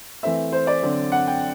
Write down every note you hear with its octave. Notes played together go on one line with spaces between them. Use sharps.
E3 A3 C4 E5
C5
D5
D3 F#3 C4
F#5
G5